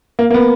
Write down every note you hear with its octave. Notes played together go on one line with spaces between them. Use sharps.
A#3
A#3
B3